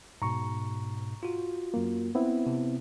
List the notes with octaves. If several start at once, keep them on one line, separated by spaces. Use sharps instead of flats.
G#2 B2 A#5 C#6
F4 F#4
F#2 A#3
B3 C4 E4
C3